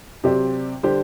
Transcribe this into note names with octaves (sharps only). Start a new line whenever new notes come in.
C3 F#3 C4 G4 D5
D3 G3 D4 G4 C5